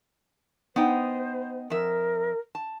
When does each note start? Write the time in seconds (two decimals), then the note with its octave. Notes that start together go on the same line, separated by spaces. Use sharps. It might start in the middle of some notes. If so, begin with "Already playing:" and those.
0.76 B3 D#4 C5 G5
1.70 F2 A#4 E5
2.55 A5